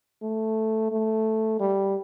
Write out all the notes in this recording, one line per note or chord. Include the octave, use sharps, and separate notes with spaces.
A3
A3
G3